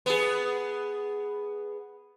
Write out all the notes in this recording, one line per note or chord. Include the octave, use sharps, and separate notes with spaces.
B3 G#4